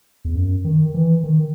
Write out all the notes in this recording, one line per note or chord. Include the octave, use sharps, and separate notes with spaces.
E2
F#2
D#3
E3
D#3